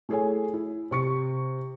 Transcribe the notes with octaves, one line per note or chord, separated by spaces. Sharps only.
A3 E4 G#4 A4 C#5 G#5
E4
C3 C#6 C#7